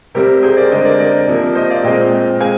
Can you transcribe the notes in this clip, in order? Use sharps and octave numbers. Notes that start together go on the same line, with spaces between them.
C3 G3 C4 G4 A#4
G#4 C5
A#4 D5
D3 G#3 C4 C5 D#5
A#4 D5
A#4 D5
C3 F3 A#3
C5 D#5
D5 F5
A#2 G#3 C4 D#5 G5
G#3 C4 F5 G#5